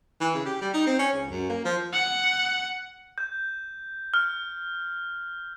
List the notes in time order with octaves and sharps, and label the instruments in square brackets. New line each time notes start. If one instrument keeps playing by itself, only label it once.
[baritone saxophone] E3
C#3
G4
G3
D#4
C4
C#4
C#2
F#2
A#3
F3
[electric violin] F#5
[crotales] G6
F6